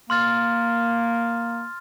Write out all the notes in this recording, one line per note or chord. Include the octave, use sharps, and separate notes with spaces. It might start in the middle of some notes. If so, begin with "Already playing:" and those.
A#3 C6 F6 A6